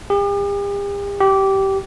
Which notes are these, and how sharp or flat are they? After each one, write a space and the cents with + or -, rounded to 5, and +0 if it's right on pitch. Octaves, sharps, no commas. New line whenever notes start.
G4 +45
G4 -15